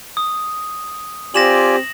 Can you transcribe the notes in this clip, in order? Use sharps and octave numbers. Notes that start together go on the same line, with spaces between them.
D#6
C4 F4 G4 D5 G#5 A#6 E7 F#7